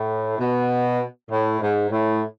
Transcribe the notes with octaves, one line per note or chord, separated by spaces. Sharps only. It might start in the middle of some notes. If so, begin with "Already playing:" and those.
Already playing: A2
B2
A2
G#2
A2